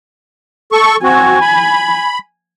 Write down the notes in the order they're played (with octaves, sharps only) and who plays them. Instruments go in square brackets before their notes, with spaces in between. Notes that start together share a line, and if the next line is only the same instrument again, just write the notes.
[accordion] A4 C#6
[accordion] C4 F#4 [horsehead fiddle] G#5
[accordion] B5